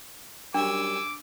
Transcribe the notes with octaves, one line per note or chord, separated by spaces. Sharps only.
F#2 G3 D4 G#5 C#6 D6 E6